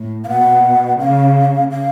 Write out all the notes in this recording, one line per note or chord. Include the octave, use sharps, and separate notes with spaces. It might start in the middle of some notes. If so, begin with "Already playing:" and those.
Already playing: A2
F5
B2 F#5
C#3 F5
F5